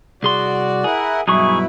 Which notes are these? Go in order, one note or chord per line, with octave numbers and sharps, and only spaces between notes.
C2 F#4 G#4 D5 C6
E4 G#4 A#4 F#5
G2 B2 F#3 D#4 E4 G#4 C#6